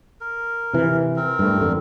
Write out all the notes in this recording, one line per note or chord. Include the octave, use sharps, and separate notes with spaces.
A#4
C3 E3
C4 A#4
G2 A3
G#1 F2 D3